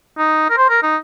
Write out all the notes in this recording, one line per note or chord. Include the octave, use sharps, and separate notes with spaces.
D#4
A#4
C5
A#4
D#4